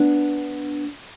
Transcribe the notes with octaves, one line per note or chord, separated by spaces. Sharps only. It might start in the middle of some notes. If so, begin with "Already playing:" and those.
Already playing: B3 D4